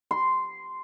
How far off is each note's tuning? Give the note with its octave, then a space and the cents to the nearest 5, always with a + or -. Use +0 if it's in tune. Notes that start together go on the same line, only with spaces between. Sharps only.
C6 -10